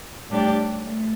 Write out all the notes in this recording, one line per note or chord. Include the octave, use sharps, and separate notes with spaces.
A2 G3 D4 G4 D5
A3